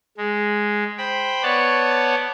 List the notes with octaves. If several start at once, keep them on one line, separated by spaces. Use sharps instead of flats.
G#3
C5 G5 B5
B3 C#5 D5 F#5 A5